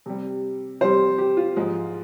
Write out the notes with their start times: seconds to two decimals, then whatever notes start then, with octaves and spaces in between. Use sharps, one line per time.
0.06 C3 G3
0.81 C3 G3 C5
1.18 G4
1.37 F4
1.56 G#2 F3 G#3